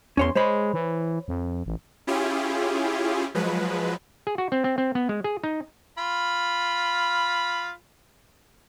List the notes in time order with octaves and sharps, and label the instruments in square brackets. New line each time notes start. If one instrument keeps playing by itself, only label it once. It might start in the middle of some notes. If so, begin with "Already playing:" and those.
[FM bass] E2 [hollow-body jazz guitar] C#4 C#5 C6
[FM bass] G#3 [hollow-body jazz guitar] C5 C#5 B5
[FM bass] E3
F2
A1
[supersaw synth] C#4 E4 F4 G4 G#4
F3 F#3 G#3 B4
[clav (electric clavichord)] G#4
F#4
C4
C4
C4
B3
G#3
G#4
D#4
[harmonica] F4 B5